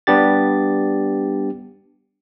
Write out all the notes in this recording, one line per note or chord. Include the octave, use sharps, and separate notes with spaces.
G3 B3 D4 G4 A6